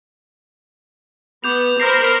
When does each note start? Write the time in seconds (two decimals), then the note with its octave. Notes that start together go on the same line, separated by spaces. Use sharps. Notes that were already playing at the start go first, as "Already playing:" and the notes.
1.44 B3 D6 G6 F7
1.80 A#4 C5 B5 F6 A#6 C7